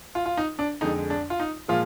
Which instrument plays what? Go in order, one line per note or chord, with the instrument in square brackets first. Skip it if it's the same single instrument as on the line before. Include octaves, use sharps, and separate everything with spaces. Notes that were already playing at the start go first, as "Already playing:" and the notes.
[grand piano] F4
F4
D#4
D4
F2 D3 G#3 D#4
D4
F4
D#4
A#2 F3 G#3 F4